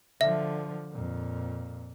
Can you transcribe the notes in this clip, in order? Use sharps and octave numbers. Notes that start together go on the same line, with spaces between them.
D3 F3 E5
F2 A#2